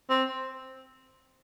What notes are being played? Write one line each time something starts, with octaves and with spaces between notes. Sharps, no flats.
C4